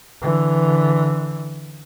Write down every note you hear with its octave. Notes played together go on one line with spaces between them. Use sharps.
D3 E3